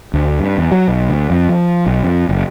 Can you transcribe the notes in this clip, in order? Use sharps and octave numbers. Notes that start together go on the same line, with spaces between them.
D2
G2
E2
F#3
B1
D2
F2
F3
B1
F2
F#1